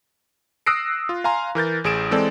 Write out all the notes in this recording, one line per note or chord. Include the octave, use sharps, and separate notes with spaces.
D#6 E6 F#6 A#6 C7 D7
F4
F5 G#5 A#5 C6
E3 A#4 G6 A6
A1 G#4 D7 E7
E3 G#3 C4 A4 D5